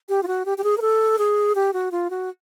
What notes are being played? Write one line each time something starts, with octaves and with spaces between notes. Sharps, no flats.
G4
F4
F#4
G4
G4
G#4
A#4
A4
G#4
G4
F#4
F4
F#4